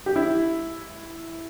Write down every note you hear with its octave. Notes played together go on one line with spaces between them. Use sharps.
G4
E4